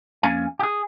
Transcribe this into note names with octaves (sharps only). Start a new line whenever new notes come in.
F2 A#3 C#4 F5 G#5
G4 G#4